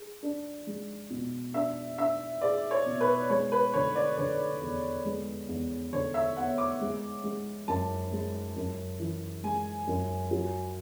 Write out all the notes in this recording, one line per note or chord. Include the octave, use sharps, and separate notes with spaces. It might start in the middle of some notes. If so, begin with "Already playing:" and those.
Already playing: G#4
D4
G#3
B2
D4 E5
D4 E5
G#4 D5
C#5
B2
B4
G#3 C#5
B4
D3 C#5
D5
D3 C#5
E2
G#3
E2
D3 C#5
E5
B3 F#5
D6
G#3
G#3
F#2 A5
G#3
F#2
E3
G#3 G#5
F#2
F#3